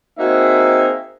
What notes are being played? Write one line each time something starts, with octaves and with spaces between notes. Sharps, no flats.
A#3 C4 D#4 F#4 G#4 E5